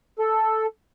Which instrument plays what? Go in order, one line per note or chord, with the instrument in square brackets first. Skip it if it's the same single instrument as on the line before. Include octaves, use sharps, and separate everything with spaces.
[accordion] A4